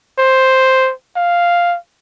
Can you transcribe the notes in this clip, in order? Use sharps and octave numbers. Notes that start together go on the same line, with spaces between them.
C5
F5